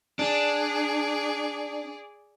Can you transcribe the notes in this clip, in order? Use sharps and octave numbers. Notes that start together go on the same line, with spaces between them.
D4 G#4 D5